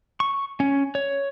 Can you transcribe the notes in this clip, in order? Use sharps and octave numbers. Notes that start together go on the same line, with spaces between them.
C#6
C#4
C#5